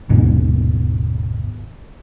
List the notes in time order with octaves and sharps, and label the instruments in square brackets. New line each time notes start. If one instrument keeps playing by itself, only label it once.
[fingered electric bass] F#1 D#2 G#2 B2